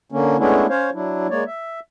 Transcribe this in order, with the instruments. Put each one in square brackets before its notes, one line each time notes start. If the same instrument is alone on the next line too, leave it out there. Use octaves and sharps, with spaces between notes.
[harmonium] D3 A#3 C#4
G#3 A3 B3 C#4 D4 E4
C#4 C5 C#5 F5
F#3 D4 E4
G#3 A#3 C#5 D5
E5